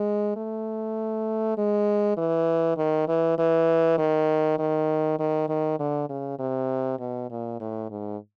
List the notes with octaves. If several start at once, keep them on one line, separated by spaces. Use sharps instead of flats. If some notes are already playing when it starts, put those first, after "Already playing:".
Already playing: G#3
A3
G#3
E3
D#3
E3
E3
D#3
D#3
D#3
D#3
D3
C#3
C3
B2
A#2
A2
G#2